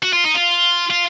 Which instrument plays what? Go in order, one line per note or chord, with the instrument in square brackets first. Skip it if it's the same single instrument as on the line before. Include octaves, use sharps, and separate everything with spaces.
[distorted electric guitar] F#4
F4
D#4
F4
F4